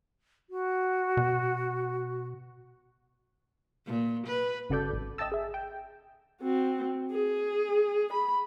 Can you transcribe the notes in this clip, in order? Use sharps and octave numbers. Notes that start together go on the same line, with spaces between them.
F#4
B2
A#2
B4
G1 C#3 F#4 A4 D5 G6
G#1
D#5 E5 G5 A5 E6
G#4 E5
G5
C4 F#4
G#4
B5